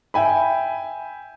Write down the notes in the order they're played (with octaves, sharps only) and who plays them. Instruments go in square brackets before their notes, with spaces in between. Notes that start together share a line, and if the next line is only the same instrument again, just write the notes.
[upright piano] E5 G5 G#5 B5